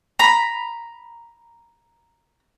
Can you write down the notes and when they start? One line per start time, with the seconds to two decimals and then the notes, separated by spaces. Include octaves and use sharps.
0.19 A#5 B5